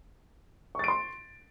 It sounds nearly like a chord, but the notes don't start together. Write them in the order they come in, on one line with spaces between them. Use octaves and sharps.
C#6 A6 D7 C6